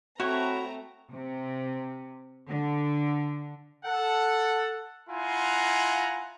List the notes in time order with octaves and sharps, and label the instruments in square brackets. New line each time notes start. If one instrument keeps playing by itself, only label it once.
[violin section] A3 C4 A#5 [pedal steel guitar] E4 C#5 C#6 [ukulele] F#4
[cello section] C3
D3
[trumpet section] A4 F#5
E4 F4 F#5 G#5 A#5 C6